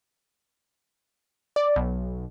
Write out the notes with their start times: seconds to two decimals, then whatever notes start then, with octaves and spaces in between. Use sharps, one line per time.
1.56 D5
1.76 B1